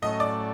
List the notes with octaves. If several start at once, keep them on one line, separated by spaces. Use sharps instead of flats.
A2 F#3 A3 C#4 D#5
D5